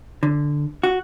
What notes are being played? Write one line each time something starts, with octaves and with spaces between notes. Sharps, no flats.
D3
F#4